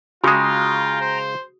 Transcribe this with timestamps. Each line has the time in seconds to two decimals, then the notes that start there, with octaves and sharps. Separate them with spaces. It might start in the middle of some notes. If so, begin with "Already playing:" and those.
0.24 C#3 G#3 F4 F#4 G5 A#5 D#6
1.01 C5